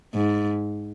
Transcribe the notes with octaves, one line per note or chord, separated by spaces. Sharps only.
G#2